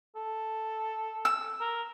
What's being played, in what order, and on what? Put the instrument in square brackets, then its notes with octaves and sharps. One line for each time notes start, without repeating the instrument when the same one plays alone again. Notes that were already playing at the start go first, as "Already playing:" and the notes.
[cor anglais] A4
[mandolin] E6
[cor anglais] A#4